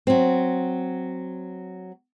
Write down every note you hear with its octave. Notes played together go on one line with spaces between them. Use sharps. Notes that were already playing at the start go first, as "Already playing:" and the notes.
F#3 C4